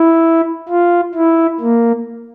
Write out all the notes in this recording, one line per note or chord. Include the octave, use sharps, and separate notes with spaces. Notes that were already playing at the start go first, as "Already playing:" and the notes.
Already playing: E4
F4
E4
A#3